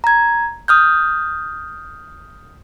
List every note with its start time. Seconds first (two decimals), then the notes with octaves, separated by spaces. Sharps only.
0.04 A#5 G#6
0.68 D#6 F6 G6